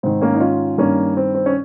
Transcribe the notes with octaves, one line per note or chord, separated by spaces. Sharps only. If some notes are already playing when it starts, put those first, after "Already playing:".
G#2 D#3 C4
A#3 C#4
D#4
C#4 F4
G2 D#3 A#3 C#4
C4
C4
C#4